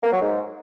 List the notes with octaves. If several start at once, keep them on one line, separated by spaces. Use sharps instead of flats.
A#3
F#3
G#2